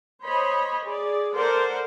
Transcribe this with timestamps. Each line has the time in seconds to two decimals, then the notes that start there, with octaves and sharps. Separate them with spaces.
0.22 C5 C#5 D#5 B5
0.85 G#4 D5
1.34 A4 A#4 C5 D5 F#5